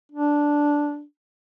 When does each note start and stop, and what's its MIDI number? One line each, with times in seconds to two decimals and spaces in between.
0.12 1.03 62